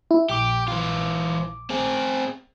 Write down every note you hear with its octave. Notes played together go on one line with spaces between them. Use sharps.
E4
A#1 G4 D6
E3 F4
C4 G#4